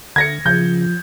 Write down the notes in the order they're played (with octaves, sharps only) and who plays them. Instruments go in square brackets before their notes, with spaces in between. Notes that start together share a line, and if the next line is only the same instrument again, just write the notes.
[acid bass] D3 [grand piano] G#6 A#6 C#7
[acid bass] C#3 [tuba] F3 [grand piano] G6